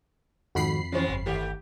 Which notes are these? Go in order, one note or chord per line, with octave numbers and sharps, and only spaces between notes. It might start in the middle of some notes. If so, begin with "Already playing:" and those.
F2 G#2 D#3 F#4 B5 C7
E3 F3 G#3 C4 C#4
G1
D#3 A3 G4